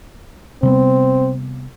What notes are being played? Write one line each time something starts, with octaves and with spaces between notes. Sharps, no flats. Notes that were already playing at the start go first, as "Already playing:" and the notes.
C3 G3 B3 C4